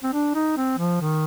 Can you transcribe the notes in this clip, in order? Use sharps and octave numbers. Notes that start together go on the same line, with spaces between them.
C4
D4
D#4
C4
F3
D#3